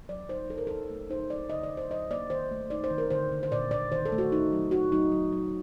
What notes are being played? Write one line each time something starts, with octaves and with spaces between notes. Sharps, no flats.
F#3 D5
D#4 C5
D#4 A4
A#4
D#4 A4
A3
D#4 C5
F#3 D5
D3 D#5
D5
D3
C5
F#3 D#5
A#3 D5
D#3 C5
A3
D#4 D5
C5
D#3
A#4
D3 C5
D3
C5
A#2 D5
A#2 D5
D#3 C5
A4
A3
F#4
D#4
F#3
D#4 F#4
F#3 D#4
F#3
F#3